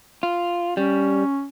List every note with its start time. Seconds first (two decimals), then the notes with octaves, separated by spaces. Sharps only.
0.23 F4
0.77 G3 C#4